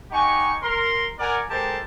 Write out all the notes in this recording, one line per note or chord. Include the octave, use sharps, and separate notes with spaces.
D#4 G4 F#5 G#5 C#6
A#4 C6
A#4 D5 F#5 G#5
G#3 G4 A4 A#4 C5 A5